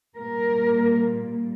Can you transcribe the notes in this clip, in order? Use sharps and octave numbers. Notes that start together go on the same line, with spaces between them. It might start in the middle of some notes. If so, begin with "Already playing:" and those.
A#2 G3 A#3 A#4